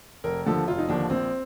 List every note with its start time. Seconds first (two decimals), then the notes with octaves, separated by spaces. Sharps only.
0.24 F1 A#4
0.45 D#2 D3 F3 A4
0.68 F1 F4
0.78 D#4
0.89 D#2 D3 F3 D4
1.10 A#1 C4